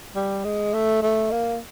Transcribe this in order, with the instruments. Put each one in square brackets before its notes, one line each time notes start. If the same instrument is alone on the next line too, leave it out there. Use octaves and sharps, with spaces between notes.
[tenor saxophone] G3
G#3
A3
A3
A#3